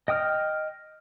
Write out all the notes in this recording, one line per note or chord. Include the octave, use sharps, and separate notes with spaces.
D#5 G5 D#6 F6